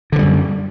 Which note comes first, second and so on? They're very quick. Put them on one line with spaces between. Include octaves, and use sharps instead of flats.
D3 E3 G3 F#2